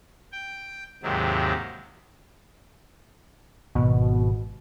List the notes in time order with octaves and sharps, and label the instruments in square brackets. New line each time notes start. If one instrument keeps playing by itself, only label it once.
[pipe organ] G5
D#2 G#2 C3 D#3 F#3
[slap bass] G#1 [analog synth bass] B2